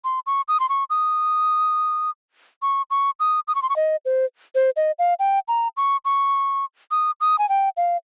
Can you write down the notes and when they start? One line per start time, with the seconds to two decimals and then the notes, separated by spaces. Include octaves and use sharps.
0.04 C6
0.27 C#6
0.48 D#6
0.60 C6
0.69 C#6
0.90 D#6
2.62 C#6
2.91 C#6
3.20 D#6
3.48 D#6
3.55 C#6
3.62 C6
3.69 C#6
3.76 D#5
4.05 C5
4.55 C5
4.76 D#5
4.99 F5
5.19 G5
5.48 A#5
5.77 C#6
6.05 C#6
6.91 D#6
7.21 D#6
7.39 G#5
7.49 G5
7.77 F5